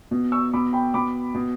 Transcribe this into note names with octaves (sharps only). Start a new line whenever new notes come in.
B2
C#6 E6
B2 B5 D6
G5 B5
B2 B5 D6
B2